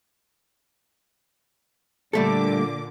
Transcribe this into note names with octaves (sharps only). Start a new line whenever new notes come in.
A#2 D3 G3 A3 A4 D6